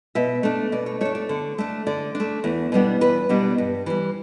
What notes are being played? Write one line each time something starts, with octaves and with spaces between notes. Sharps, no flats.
B2 E5
A3 D4
B2 D5
C#5
A3 D4 C#5
D5
D3
A3 D4
D3 D5
D4
A3
E2
B2 G3 B3 D4
E2 B4
B2 G3 B3 D4
G2
E3 G3